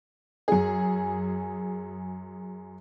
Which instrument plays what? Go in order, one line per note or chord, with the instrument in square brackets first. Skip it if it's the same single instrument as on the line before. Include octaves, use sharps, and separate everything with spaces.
[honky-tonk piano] F#2 G#4